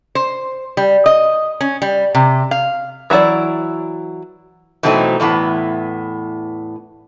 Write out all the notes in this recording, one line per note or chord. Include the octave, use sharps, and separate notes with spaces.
C5
G3
D#5
C#4
G3
C3
F5
E3 F#3 G#3 E4 D5
B2 E3 F#3 A3 C4 D#4
E2 A2 E3 B3